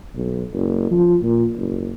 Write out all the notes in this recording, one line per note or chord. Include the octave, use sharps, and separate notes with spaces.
B1
F#1
F3
A#2
F#1